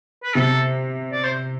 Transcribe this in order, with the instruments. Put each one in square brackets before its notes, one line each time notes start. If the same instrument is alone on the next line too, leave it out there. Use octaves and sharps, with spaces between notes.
[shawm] B4
[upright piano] C3 [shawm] A4
[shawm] D5
C5